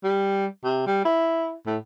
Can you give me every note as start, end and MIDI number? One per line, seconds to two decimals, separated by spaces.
0.04 0.46 55
0.64 0.86 48
0.86 1.03 55
1.05 1.53 64
1.66 1.77 45